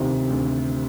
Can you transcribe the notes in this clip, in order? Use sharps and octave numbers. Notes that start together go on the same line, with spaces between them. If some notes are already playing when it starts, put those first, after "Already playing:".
Already playing: D2 C3 D#3
D2